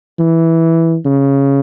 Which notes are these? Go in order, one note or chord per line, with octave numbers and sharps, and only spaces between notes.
E3
C#3